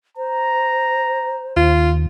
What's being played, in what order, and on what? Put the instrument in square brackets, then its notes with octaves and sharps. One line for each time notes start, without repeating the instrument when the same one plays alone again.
[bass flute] C5 [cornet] A#5
[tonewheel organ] D#2 [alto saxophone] F4